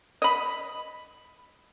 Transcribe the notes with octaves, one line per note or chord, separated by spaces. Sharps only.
D#5 B5